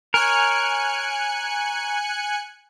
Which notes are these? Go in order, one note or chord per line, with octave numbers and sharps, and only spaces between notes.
A#4 C#5 G#5 F#6 C#7